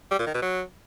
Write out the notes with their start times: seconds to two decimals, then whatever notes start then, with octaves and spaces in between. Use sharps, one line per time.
0.11 G3
0.19 A#2
0.27 D#3
0.34 B2
0.42 F#3